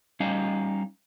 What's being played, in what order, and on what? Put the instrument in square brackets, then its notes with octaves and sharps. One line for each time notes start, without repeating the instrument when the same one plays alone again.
[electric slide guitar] G3 C#4 D#4 F5